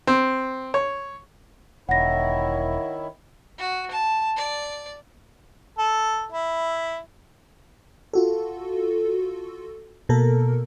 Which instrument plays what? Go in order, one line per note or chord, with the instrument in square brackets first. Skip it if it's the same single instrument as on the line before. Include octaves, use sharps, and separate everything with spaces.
[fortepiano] C4
C#5
[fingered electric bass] E1 [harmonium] D#3 E4 [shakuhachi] C#5 [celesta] F#5 A#6
[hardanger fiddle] F#4
A5
D5
[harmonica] A4
E4
[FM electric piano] F4 F#4 A4
B2 A#3 A4 A#4